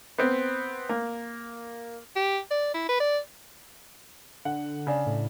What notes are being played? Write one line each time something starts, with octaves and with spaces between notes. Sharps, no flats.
B3 C4
A#3
G4
D5
E4
B4
D5
D3 F#5
C#3 D4
A2